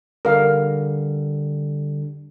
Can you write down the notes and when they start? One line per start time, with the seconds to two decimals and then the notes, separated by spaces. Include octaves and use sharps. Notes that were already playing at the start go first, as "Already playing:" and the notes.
0.25 D3 G3 A#4 F5